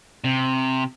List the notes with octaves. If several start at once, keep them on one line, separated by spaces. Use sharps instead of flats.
C3